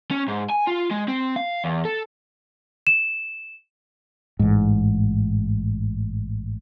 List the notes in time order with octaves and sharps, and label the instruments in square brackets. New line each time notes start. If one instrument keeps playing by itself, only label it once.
[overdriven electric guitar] C#4
G#2
G#5
F4
G#3
C4
F5
E2
A4
[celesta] E7
[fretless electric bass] A1 G#2